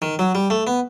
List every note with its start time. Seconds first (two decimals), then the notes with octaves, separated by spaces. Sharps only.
0.02 D#3
0.19 F#3
0.35 G3
0.50 A3
0.67 B3